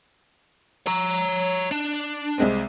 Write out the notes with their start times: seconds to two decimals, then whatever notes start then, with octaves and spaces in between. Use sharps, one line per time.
0.87 C#5 A#5
1.71 D4
2.38 C2 G#3 C4